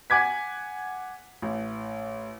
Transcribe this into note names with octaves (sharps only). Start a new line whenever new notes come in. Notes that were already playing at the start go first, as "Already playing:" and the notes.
F#5 G#5 D6 G#6 B6
A1